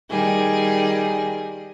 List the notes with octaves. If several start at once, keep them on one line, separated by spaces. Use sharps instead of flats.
D#3 G3 G#4